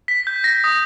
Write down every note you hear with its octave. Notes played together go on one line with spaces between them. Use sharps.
B6
G6
A#6
D#6